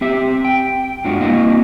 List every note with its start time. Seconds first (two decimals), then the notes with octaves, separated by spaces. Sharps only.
0.01 C4 G4 E5
0.45 G5
1.04 G2 G#3 D4 F4 F#4
1.21 A#3 C4 E4 F#4 D#5 F5